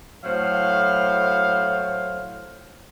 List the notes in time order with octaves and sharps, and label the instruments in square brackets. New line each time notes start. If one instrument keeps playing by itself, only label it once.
[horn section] A2 F#3 C5 F5